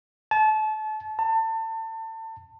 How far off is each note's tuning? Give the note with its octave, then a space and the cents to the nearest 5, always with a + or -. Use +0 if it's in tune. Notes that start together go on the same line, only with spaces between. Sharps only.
A5 -30
A5 +30